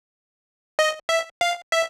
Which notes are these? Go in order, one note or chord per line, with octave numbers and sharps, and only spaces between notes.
D#5
E5
F5
E5